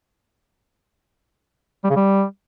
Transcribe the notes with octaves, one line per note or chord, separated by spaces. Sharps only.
G3
C#3
G3